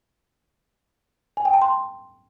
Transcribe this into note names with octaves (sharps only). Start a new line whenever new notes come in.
G#5
G5
A5
C6